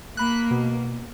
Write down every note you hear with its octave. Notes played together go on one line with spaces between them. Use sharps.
A#3 B5 F#6
B2